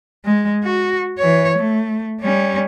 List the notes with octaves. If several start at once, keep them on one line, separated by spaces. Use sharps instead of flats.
G#3
F#4
E3 C#5
A3
G3 C#4